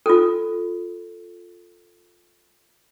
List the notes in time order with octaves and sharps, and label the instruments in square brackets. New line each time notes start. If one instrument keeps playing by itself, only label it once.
[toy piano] F4 A4